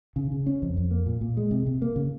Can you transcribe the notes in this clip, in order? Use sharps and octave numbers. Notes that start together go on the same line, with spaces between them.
C#3
C#3
C#4
F2
F2
A#3
A#2
A#2
G#3
C3
C3
A#3
C#3